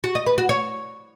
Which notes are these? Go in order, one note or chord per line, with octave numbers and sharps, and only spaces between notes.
F#4
D#5
B4
F#4
C#5